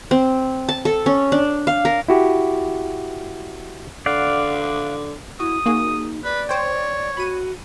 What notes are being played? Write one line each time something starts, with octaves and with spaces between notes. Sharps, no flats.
C4
A5
A4
C#4
D4
F5
A#4
E4 F#4 G4
D3 D5 F5 F#5
E4 F#4 D#6
A#3 D#4 F#4 G#4
B4 D5
C5 C#5 G5
F#4 B5 D#7